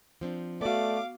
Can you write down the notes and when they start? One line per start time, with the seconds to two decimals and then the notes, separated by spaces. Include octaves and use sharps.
0.21 F3 C4 D4
0.61 A3 B3 F#4 D5 F5 D6